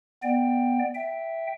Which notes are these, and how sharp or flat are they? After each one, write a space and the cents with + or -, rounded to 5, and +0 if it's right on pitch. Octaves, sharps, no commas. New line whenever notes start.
B3 +0 D5 +15 G5 +10
E5 +0 G5 +0